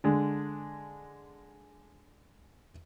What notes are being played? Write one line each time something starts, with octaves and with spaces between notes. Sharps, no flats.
D3 G#3 D4